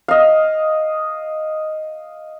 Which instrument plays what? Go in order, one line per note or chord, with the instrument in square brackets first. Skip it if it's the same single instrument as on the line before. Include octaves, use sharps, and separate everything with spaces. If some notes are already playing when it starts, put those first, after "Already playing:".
[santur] D#5 F5